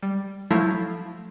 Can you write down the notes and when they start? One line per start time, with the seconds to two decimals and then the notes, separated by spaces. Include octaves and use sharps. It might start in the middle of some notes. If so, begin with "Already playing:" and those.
0.02 G3
0.50 F3 F#3 A3 E4 F4